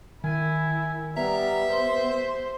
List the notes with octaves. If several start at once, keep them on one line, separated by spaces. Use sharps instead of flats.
D#3 E4 G#5
G3 B3 E5 A#5
C5 C6